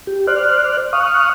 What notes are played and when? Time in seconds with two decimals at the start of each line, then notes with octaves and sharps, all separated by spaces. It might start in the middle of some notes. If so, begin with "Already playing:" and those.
0.07 G4
0.27 C5 D5 F6 F#6
0.93 F5 C#6 D#6 F6 F#6